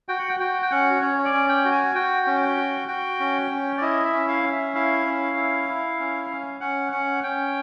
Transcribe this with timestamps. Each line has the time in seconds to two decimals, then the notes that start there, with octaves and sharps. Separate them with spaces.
0.09 F#4 G5
0.19 F#5
0.29 G5
0.40 F#4 G5
0.62 G5
0.71 C#4 F#5
1.01 C#4 C#5
1.18 C#5
1.25 D5
1.33 C#4
1.49 G5
1.65 F#4
1.72 G#5
1.95 F#4 G5
2.27 C#4
2.42 G5
2.57 F#4
2.88 F#4 G5
3.20 C#4
3.51 C#4
3.78 D5
3.81 E4 D#5
4.05 E5
4.13 C#4
4.28 F5
4.43 C#4
4.52 E5
4.75 E4 F5
5.06 C#4
5.36 E4
5.69 E4
5.99 C#4
6.30 C#4
6.61 C#4 F#5
6.92 C#4 F#5
7.23 C#4 G5